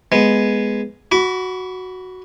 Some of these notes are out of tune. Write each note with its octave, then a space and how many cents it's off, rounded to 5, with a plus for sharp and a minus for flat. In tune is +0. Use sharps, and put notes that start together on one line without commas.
G#3 +5 B3 +0
F#4 +0 B5 +0 D6 -45